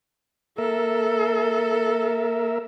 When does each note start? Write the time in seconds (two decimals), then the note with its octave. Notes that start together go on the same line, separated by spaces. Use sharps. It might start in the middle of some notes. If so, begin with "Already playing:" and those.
0.58 A#3 A4 A#4 E5